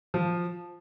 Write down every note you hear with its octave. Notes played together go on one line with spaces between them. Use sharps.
F3